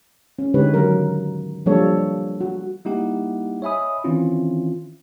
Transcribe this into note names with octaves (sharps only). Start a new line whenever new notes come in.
C#4
D3 G#3 D#4 G4 B4 C#5
D#3 F#3 G4 A#4
F3 G3 A#3 D4 A4 C#5
F#4
G3 A#3 D#4 E4 G4 F#5
C#5 D#5 E5 G#5 B5 D#6
D#3 E3 C4 C#4 E4 F4